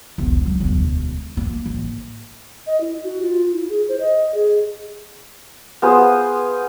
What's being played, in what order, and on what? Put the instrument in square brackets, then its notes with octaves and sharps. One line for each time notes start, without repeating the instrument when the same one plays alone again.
[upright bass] E1 B1
F#3
E1 D2
A#3
A1
[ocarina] D#5
E4
F#4
F4
E4
G#4
C5
D#5
G#4
[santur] B3 F4 G#4 C5